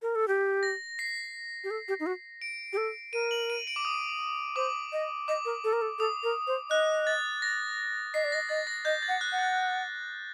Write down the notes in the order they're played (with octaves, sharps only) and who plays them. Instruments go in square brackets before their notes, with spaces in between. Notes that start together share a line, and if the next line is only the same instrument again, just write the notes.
[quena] A#4
A4
G4
[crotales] A#6
C7
[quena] G4
A4
G4
D#4
F#4
[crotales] D7
[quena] G4
A4
[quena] A#4 [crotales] D#7
[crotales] F#7
D#7
D7
D6
D#6
[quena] C5 [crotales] D6
[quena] D#5
[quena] D#5 [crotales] D6
[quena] A#4
A4
A#4
A4
[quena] A4 [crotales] D#6
[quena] A#4
C5
[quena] D#5 [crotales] F#6
[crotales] A6
A#6
[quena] D#5 [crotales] C7
[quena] D5
[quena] D#5 [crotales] A#6
[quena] D#5 [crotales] A6
[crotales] A#6
[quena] D#5 [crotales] G6
[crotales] A6
[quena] F#5
[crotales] F#6
[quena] F#5
[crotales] A6